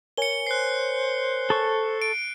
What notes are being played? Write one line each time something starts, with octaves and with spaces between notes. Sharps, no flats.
A#4 C#5 G#5 C#7 G7
C5 F#6 C7
A4 C#6
D7